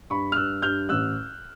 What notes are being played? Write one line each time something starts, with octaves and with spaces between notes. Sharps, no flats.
G2 B5 C#6
F6
G2 E6 F#6
G2 F6 G6
A1 E6 F#6